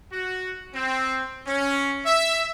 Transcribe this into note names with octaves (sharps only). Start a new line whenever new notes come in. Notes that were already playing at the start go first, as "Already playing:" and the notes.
F#4
C4
C#4
E5